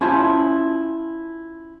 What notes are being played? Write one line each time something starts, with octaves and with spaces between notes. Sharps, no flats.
C#4 E4 F4 C5 A5